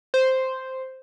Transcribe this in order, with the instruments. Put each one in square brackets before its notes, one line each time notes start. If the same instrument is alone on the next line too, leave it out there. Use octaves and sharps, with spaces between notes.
[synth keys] C5